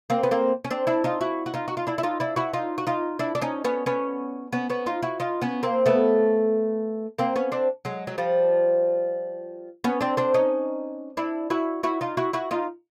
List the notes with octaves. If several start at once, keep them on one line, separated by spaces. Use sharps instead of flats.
A#3 C4
B3
A#3 C4
C#4
C4 D4
D4 E4
D#4 F4
E4 F#4
F#4
D#4 F4
F#4
F4
D4 E4
E4
D#4 F4
D4 E4
E4 F#4
D#4 F4
F#4
D#4 F4
D4 E4
D4
C#4 D#4
B3 C#4
B3 C#4
B3 C#4
B3 C#4
D#4 F4
E4 F#4
D#4 F4
B3 C#4
A#3 C4
A3 B3
A#3 C4
B3 C#4
C4 D4
F#3 G#3
F#3
F3 G3
B3 C#4
C4 D4
C4 D4
C#4 D#4
D4 E4
E4 F#4
E4 F#4
D#4 F4
E4 F#4
E4 F#4
D#4 F4